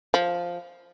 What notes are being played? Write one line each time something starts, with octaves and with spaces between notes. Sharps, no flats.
F3